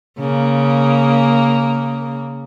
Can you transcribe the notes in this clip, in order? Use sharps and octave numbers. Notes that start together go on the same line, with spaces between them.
C#3 A#3